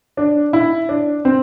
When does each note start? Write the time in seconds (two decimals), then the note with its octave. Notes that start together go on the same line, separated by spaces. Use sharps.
0.17 D4
0.53 E4
0.89 D4
1.25 C4